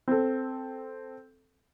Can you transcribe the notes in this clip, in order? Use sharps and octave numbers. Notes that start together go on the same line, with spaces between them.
C4 A4